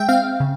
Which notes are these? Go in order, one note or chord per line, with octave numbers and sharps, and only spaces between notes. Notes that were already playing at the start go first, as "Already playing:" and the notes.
Already playing: G#3 E5 G5
C4 F5
C#3